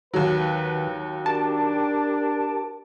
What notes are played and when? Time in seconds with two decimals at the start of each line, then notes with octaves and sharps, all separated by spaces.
0.14 D#2 D#3 F#3 B4
1.26 D4 G4 A#4 A5 D6